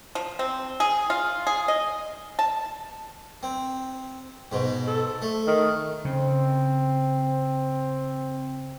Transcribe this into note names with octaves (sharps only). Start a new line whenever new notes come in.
F3
C4
G#4
F4
G#4
D#5
A5
C4
G#2 B2
A4
A3
D#3
C#3 C4